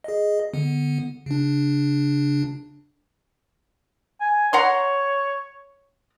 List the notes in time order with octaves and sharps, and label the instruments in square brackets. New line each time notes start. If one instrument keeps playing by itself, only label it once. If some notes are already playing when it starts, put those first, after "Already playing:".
[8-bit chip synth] G#4 D#5
D3 B3
C#3 D4
[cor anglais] G#5
[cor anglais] C#5 [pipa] F#5 A#5 C6